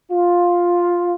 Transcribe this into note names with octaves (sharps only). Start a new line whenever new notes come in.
F4